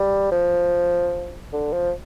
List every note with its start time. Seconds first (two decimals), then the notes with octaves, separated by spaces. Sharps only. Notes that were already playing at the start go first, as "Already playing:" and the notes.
Already playing: G3
0.32 F3
1.53 D3
1.73 F3